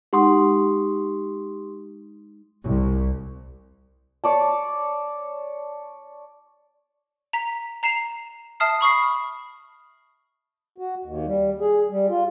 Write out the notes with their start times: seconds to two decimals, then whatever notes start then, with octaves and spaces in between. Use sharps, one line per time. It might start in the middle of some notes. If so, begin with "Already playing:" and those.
0.13 G#3 D#4 G4 F#5 C6 D#6
2.65 C2
4.24 C#5 D5 A5
7.33 A#5 B6
7.83 A#5 C7 E7 F7
8.60 E5 A5 D#6 F6 C7
8.81 B5 C#6 D#6 C7
10.78 F#4
11.04 D#2
11.26 G3
11.60 G#4
11.89 G3
12.09 F4